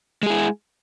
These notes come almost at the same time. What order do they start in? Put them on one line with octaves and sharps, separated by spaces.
G#3 G#4 E4